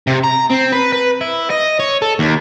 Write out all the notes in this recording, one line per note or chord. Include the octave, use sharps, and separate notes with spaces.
C3
A#5
C4
B4
B4
E4
D#5
C#5
A4
D#2